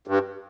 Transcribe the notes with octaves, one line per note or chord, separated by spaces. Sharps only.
G2